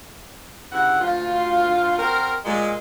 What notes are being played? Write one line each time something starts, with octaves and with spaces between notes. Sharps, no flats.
G2 C#3 E4 F#5
D2 F4
C4 F#4 A#4
A#2 G#3